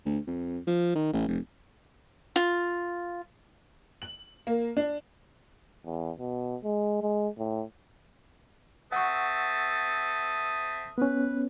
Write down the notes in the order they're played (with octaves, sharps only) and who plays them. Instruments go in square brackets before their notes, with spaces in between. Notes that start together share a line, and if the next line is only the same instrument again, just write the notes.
[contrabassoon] D2
F2
F3
D#3
A1
F1
[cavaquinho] F4
[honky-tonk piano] F#7
A#3
D4
[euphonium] E2
B2
G#3
G#3
A2
[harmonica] C4 A4 E5 [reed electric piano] F#5 C#6 [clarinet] D#6
[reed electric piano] B3 C#4 [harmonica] B4